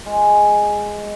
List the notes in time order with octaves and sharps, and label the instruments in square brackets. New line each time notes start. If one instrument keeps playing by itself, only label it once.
[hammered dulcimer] G#3